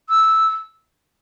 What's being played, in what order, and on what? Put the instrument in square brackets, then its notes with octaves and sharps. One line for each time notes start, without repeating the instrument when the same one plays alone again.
[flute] E6